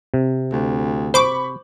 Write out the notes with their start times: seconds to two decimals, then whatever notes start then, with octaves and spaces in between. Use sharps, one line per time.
0.14 C3
0.52 D2
1.14 C5 B5 C#6 D6